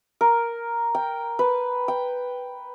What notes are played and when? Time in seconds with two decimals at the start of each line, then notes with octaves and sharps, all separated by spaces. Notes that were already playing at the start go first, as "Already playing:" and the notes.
0.21 A#4
0.95 G5
1.39 B4
1.88 G5